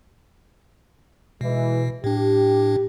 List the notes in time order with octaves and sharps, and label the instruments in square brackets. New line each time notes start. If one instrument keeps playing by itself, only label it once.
[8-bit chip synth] B2 [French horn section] E3 G#3
[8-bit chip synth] A2 D4 [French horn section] G4